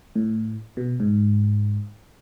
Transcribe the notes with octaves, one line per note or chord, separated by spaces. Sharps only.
A2
B2
G#2